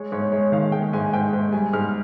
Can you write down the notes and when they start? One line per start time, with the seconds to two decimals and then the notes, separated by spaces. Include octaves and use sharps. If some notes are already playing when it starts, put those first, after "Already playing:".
Already playing: G#3 C#5
0.12 G#2 C#5
0.32 G#3 C#5
0.52 D#3 F5
0.72 G#3 G5
0.93 G#2 G#5
1.13 G#2 G5
1.33 G#2
1.52 G3 G#5
1.73 G#2 F6